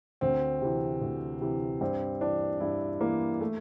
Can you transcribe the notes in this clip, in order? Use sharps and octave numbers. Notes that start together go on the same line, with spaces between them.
D2 C4
C3 E3
D2
C3 E3
G2 C4
E3 D4
G2 E4
E3 A#3
A3